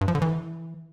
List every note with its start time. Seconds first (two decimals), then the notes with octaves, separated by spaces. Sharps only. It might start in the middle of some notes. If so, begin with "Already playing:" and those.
0.01 G2
0.08 F3
0.15 D3
0.22 E3